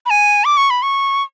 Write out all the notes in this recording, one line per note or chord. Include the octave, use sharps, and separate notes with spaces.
B5
G#5
D6
C#6
B5
C#6